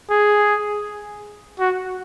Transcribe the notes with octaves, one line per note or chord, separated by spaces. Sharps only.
G#4
F#4